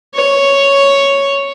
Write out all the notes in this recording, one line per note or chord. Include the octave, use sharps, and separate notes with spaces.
C#5